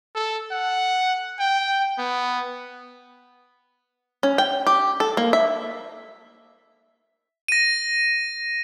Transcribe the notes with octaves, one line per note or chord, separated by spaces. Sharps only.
A4
F#5
G5
B3
C#4
G5
G4
A4
A#3
E5
A#6 D#7